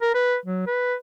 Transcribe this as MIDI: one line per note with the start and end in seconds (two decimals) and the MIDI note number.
0.02 0.11 70
0.14 0.36 71
0.46 0.64 54
0.67 0.95 71